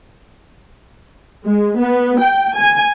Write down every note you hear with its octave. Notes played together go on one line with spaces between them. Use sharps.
G#3
B3
G5
G#5